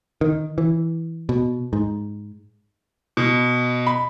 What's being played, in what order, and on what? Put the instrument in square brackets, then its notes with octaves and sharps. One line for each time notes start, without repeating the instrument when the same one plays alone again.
[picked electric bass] D#3
E3
B2
G#2
[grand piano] B2
B5